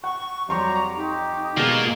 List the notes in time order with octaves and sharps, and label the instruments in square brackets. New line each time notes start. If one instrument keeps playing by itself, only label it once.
[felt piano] F#5 [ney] C#6
[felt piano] F2 C6 C#6 [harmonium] F#3 G3 G4 [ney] A#5
[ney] D#4 [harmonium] G4
[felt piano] B2 G#3 [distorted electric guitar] A#3 F4